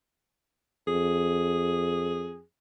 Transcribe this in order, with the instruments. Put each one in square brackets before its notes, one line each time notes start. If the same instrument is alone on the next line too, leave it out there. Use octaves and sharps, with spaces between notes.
[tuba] F2 [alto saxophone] G#4